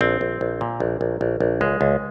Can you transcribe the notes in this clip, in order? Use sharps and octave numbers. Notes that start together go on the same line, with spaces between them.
A#1 C4
A#1
A#1
A#2
A#1
A#1
A#1
A#1
C#2 G#3
C#2